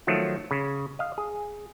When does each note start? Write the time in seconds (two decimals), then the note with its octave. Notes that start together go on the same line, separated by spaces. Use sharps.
0.07 D#3 F3 F#3 A3
0.51 C#3
0.99 D#5 F5
1.18 G#4